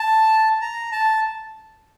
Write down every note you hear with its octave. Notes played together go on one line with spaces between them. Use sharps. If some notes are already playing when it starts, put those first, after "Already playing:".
Already playing: A5
A#5
A5